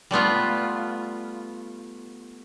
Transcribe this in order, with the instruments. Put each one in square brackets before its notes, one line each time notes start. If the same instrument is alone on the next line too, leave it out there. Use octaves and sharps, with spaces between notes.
[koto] G3 A3 B3 F4